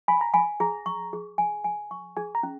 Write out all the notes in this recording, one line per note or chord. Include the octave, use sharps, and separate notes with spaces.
G#5 B5
A#5
G#5 B5
G#4 A#5
C#6
G#4
G#5
G#5
C#6
G#4 G#5
A#5
C#4